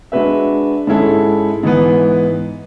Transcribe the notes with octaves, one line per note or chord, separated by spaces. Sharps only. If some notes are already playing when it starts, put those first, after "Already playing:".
G#3 D4 F#4 B4 E5
G#2 G#3 C#4 E4 A4
G#2 E3 B3